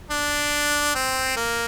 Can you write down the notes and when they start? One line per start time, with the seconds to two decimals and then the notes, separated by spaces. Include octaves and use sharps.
0.11 D4
0.95 C4
1.37 A#3